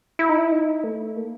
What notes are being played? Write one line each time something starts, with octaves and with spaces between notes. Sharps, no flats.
E4
D#4
E4
D#4
A3
A#3